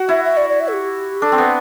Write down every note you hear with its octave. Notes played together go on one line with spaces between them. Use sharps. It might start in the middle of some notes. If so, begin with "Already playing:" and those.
Already playing: F#4
E4 E5
E5
D5
D5
E5
A4
G4
D4 A4
C4
B3